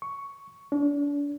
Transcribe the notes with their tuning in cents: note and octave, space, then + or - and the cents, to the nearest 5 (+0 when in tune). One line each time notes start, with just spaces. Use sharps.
C#6 +5
D4 -35